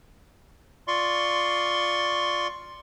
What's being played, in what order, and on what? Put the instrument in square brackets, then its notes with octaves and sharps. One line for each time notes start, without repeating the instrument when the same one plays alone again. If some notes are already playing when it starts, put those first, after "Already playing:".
[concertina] F4 D5 C6 C#6